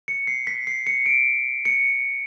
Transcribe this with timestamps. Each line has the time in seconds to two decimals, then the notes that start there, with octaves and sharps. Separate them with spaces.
0.08 C#7
0.27 C7
0.47 B6
0.67 C7
0.87 C#7
1.06 D7
1.65 C#7